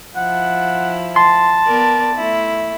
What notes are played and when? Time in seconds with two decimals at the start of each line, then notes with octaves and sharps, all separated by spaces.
0.16 F3 E4 F#5
1.16 A5 C6
1.66 B3 A#4 D5
2.14 A3 E4